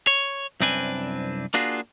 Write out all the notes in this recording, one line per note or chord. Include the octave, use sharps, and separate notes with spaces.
C#5
C2 F#2 C4 D4 B4 G#5
A#3 D4 F4 F#4 G#4